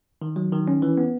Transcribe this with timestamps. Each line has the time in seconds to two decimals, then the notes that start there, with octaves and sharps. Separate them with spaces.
0.22 D#3
0.36 F#3
0.52 D#3
0.68 C#4
0.82 E3
0.98 B3